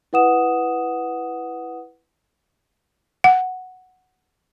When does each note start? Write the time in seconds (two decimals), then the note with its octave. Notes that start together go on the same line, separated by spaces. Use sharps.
0.13 E4 B4 F#5 D#6 E7
3.24 F#5